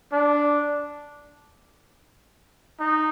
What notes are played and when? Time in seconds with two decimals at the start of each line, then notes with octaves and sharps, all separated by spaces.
0.12 D4
2.80 D#4